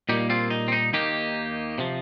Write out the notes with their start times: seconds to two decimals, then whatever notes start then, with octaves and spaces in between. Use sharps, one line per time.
0.09 A#2 G3 A#3 D#4 G4
0.30 C4 F4
0.50 D#4
0.68 C4
0.72 D#4
0.93 D#2 D#3 A#3 D#4 G4
1.78 C3 F3